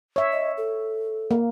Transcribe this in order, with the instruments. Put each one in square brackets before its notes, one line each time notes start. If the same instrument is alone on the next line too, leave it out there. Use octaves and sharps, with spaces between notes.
[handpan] C#5 E5
[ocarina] D#5
A4
[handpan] A#3